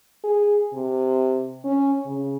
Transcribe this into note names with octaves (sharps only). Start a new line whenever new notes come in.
G#4
C3
C#4
C#3